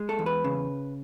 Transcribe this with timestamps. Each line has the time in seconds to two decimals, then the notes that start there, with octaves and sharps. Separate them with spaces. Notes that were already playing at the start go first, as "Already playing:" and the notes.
Already playing: G#3
0.09 A4
0.19 E2
0.26 B4
0.44 C#3